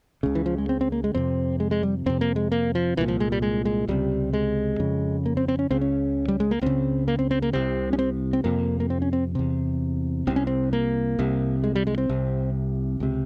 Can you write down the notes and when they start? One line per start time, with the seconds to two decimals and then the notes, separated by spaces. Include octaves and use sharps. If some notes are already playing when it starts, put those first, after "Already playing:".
0.23 C#2 C#3
0.35 E3
0.46 F3
0.58 G#3
0.69 C4
0.81 C4
0.92 A#3
1.04 G#3
1.15 F2 C3 C4
1.60 G#3
1.71 G#3
1.83 G3
2.06 F2 C3 C4
2.21 A#3
2.36 G#3
2.52 A#3
2.75 F3
2.97 C2 A#2 E3
3.08 F3
3.20 G#3
3.32 G3
3.42 G#3
3.65 G#3
3.88 C#2 C3 G3
4.33 G#3
4.79 F2 C#3
5.26 A#3
5.37 C4
5.48 C4
5.59 C#4
5.71 C#2 C#3 C4
5.81 C#4
6.28 G3
6.40 G#3
6.51 A#3
6.61 C#2 C#3 C4
7.08 A#3
7.19 C4
7.31 C4
7.42 A#3
7.53 C2 C3 C4
7.93 C#4
7.99 C4
8.33 C4
8.44 F2 C3 A#3
8.80 A#3
8.90 C4
9.02 C#4
9.13 C4
9.35 E2 C3
10.27 C2 C3 C4
10.36 C#4
10.47 C4
10.73 A#3
11.19 C2 C3
11.64 G#3
11.75 G3
11.87 G#3
11.98 C4
12.09 C2 C3
13.00 C#2 C3